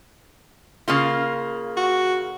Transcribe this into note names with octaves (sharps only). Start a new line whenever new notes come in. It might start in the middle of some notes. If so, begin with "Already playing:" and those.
C#3 A#3 F4
F#4